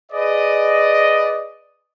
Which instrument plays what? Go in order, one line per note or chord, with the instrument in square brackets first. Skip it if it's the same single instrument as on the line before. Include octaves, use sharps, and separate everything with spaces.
[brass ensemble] G#4 B4 D5 D#5